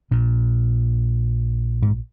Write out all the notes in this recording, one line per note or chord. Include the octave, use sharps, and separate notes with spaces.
A#1 A#2
G#2